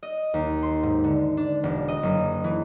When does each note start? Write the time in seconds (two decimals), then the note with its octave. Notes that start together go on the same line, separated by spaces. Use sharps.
0.03 D#5
0.34 D#2
0.63 C6
0.83 G#2
1.04 D3
1.37 D4
1.63 E1
1.88 D#5
2.03 F#1
2.44 E3